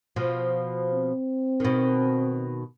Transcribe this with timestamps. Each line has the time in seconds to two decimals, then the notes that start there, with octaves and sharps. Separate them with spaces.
0.16 B2 F3
0.93 C4
1.60 B2 D#3